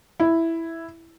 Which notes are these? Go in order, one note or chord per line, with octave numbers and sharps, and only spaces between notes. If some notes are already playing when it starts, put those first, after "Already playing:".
E4